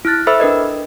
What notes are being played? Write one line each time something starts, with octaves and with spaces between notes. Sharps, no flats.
E4 F6 F#6 A6
A4 C5 E5 B5 E6
D4 A#4 B4 D#5